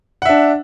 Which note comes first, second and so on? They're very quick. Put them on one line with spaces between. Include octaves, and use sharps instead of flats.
F#5 E5 D4